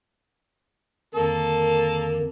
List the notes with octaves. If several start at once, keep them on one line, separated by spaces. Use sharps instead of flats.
F2 D3 D#3 A#3 A4 A5